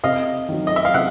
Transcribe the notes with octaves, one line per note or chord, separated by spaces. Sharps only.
C3 D#5 F5
D#3 F#3
D#5
E5
F5
C3 E5 F#5